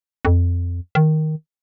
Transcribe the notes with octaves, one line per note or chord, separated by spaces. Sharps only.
F2
D#3